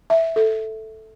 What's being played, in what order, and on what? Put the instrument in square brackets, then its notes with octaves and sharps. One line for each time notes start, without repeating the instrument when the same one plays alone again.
[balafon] E5
A4